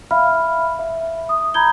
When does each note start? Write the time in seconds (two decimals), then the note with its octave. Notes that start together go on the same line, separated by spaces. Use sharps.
0.11 E5 F5 B5 F6
0.79 E5
1.29 D#6
1.54 A#5 B5 G6 G#6 G7